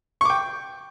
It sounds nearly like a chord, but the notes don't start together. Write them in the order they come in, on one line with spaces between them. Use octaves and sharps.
C#6 D6 G5